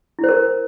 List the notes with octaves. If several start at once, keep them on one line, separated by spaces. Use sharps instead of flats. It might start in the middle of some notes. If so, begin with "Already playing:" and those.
E4
C5
A#4